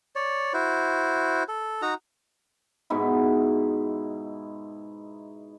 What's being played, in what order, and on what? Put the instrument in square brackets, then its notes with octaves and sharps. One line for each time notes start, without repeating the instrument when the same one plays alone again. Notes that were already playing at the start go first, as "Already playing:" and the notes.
[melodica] C#5 D5
E4 F#4 C5
A4
D#4 F#4 A#5
[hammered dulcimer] G#2 B2 D#4 E4